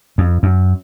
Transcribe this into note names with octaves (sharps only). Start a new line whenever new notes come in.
F2
F#2